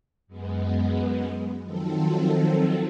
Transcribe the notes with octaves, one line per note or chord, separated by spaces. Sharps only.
F#2 G#3 B3
D#3 F3 F#3 C4 A4